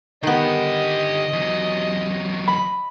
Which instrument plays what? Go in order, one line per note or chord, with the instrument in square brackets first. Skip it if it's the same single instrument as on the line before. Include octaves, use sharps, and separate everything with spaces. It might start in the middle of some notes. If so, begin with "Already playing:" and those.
[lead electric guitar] D3 G4 [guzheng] D#3 B3 [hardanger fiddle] D#5
[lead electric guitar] E2 F#3
[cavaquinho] B5